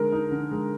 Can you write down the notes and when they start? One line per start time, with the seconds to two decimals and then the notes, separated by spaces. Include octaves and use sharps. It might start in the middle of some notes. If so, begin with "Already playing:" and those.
Already playing: D3 G#3 D#4 A#4
0.12 D#4
0.32 D3
0.52 G#3